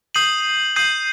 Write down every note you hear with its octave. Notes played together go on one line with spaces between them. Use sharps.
D#6 G6 C7 D#7 F#7
D#6 G6 C7 D#7 F#7